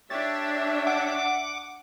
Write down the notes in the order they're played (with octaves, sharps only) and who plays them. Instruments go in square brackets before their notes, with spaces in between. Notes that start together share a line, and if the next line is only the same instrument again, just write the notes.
[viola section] D4 E5 [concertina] G4 C#5 [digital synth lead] A6
[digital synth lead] F#5 [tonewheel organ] D6